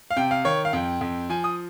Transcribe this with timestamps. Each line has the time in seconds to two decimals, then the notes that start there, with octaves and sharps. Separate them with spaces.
0.11 F5
0.17 C3 G5
0.31 F5
0.45 D#3 C#5
0.65 F5
0.73 F2 G5
1.01 F2
1.30 F3 G#5
1.44 D#6